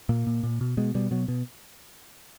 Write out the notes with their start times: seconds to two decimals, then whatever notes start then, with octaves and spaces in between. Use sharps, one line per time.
0.09 A#2 A#3
0.27 A#2
0.43 A#2
0.61 B2
0.77 B2 G#3
0.95 B2 G3
1.11 B2 F#3
1.28 B2